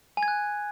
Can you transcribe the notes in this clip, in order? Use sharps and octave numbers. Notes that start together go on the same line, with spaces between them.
G#5
G#6
F#6